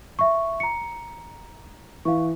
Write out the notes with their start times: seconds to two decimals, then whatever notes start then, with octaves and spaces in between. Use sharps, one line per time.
0.19 E5 C#6
0.60 A#5 C#7
2.05 E3 F5 C#6